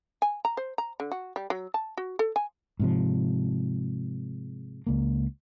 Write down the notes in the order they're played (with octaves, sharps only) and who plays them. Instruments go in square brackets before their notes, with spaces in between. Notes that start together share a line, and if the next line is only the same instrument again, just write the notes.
[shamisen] G#5
A#5
C5
A#5
D3
F#4
G3
F#3
A5
F#4
A4
G#5
[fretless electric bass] G#2 C3 F3
C#2 A#3